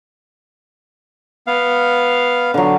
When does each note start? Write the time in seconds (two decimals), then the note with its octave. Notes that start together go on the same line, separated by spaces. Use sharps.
1.47 B3 F5
2.54 D3 F#3